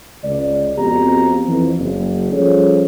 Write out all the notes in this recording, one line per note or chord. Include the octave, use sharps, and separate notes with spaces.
C#2 D5
F2 B3 C4 F#4 G4 A#5
F2 E3
F#1
F3 G3 C#4 G#4 A4 C#5